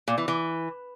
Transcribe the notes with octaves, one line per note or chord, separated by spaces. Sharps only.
A#2
E3
E3